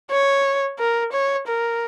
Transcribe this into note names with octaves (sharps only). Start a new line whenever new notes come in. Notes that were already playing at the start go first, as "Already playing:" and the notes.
C#5
A#4
C#5
A#4